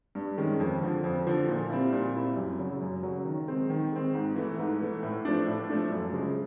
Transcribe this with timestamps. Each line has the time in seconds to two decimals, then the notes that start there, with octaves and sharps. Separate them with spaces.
0.15 G2
0.38 D#3 G#3 C#4
0.60 F2
0.82 D3 F3
1.04 F2
1.27 D3 F3
1.48 A#2
1.70 G3 C4 E4
1.93 A#2
2.15 G3 C4 E4
2.36 F#2
2.59 C#3 F#3
2.81 F#2
3.03 C#3 F#3
3.25 D#3
3.48 G#3 C4
3.70 D#3
3.92 G#3 C4
4.14 G#2
4.36 E3 A3
4.59 G#2
4.81 E3 A3
5.03 A2
5.25 F3 A3 D4
5.47 A2
5.70 F3 A3 D4
5.92 F#2
6.13 C#3 F3 G#3